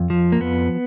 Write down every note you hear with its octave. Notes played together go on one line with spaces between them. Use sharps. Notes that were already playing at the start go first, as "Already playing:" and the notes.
Already playing: F2
F3
A#3
F2 B3